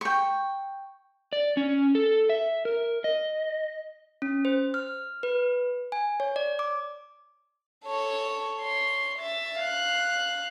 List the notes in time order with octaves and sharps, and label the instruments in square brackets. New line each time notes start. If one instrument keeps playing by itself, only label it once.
[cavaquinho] G5 C#6
[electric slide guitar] D5
C#4
A4
E5
A#4
D#5
[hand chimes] C#4
C5
F6
B4
G#5
C#5
D5
D6
[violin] A4 C#5
C#5 C6
E5 A6
F5 F#6